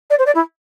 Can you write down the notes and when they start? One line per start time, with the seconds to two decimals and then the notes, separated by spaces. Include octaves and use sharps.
0.10 D5
0.18 C5
0.26 D5
0.35 E4